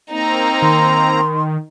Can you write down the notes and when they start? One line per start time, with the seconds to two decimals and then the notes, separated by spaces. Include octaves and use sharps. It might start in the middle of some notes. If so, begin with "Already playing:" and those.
0.11 A#3 C4 D#4 A#5
0.62 D#3 C6